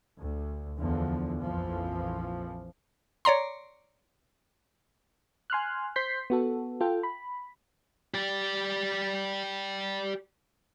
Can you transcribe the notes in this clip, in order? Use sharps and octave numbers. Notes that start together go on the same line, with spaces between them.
D2
E2 D3 F3
A#1 F2 E3 F3
C#5 D5 A#5 C6
G#5 C6 F6 F#6
C5 C6 G6 B6 C7
B3 F#4 A4
F4 A4 G5
B5
G4 D5